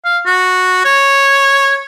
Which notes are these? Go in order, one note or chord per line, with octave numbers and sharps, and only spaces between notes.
F5
F#4
C#5